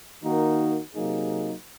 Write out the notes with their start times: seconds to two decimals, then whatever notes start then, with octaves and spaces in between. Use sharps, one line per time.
0.22 D#3 A#3 D#4 F#4 A#4
0.94 C3 F#3 A#3 D#4 G#4